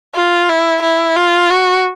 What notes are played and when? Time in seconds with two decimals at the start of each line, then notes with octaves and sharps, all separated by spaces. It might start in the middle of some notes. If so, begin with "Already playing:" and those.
0.15 F4
0.49 E4
0.82 E4
1.16 F4
1.50 F#4